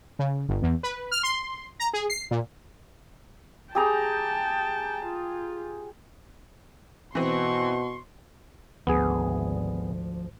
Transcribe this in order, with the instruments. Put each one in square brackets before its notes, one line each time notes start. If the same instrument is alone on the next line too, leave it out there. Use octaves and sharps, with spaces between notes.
[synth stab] C#3
G1
E2
B4
F6
C6
A#5
G#4
C7
A#2
[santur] G4 G#4 A#5 [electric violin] G5 A5
[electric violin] F4
[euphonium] B2 [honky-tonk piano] E3 C4 [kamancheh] C6 C#6
[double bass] G#1 [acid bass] D2 [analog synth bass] F3 [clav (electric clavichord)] B3 G#4